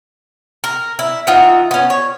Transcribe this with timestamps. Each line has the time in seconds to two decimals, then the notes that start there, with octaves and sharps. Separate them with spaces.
0.64 A#4
0.99 E4
1.27 E3 D#4 F4 F#5
1.71 B3 C#4
1.90 C#5